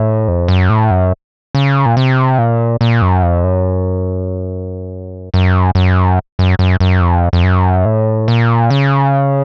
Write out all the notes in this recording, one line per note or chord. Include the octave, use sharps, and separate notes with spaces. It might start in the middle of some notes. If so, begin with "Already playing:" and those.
Already playing: A2
F2
F#2
A2
F#2
C#3
A#2
C3
A#2
A#2
F#2
F2
F#2
F#2
F#2
F#2
F#2
F#2
F2
F2
F#2
A2
A#2
C#3